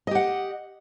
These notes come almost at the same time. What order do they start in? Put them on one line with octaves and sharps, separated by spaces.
D#5 G4 F#5